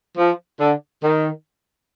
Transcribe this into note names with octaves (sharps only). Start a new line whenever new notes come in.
F3
D3
D#3